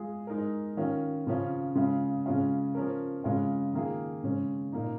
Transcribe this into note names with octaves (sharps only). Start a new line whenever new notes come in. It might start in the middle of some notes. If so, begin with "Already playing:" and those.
Already playing: G#3 F4 G#4
G#3 D#4 A#4
D#3 C#4 F4 A#4
C#3 F3 C#4 F4
C#3 G#3 F4
C#3 G#3 C#4 F4
F3 C#4 A#4
C#3 G#3 C#4 F4
D#3 A#3 F4 G#4
C#3 G#3 C#4
A#2 A#3 D#4